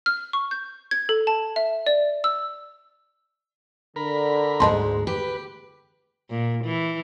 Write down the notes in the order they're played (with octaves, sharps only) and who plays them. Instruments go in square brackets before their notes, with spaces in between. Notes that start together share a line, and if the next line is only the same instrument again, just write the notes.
[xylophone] F6
C#6
G6
G#6
A4
A5
E5
D5
E6
[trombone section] D3 [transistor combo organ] A#4 B5
[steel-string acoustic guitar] D2 G#2 G#3 [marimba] D#5 A5 C6
[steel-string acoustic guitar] G4 [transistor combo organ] B4
[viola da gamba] A#2
E3